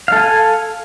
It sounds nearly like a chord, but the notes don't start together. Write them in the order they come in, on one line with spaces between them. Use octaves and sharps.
F5 A4 G#5